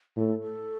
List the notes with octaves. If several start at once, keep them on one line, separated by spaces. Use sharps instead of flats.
A2 A4
A4